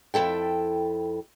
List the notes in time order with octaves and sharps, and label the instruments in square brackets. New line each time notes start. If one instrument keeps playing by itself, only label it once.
[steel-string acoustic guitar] F2 E4 A4 G5